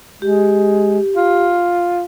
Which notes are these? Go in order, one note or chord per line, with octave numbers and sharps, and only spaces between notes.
G#3 G4
F4